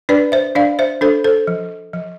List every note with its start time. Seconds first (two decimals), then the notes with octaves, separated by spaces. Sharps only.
0.09 D4 B4 D5
0.32 C5 E5
0.55 D4 D5 F5
0.79 C5 E5
1.01 D4 A4 C5
1.24 A4 C5
1.47 F3
1.93 F3